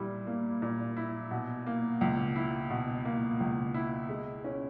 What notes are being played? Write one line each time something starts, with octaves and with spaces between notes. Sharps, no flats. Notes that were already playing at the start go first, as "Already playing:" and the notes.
Already playing: A#2 G3 E4
A#3
A#2
E4
B2
A#3
C#2
E4
B2
A#3
C#2
E4
G#3
C#4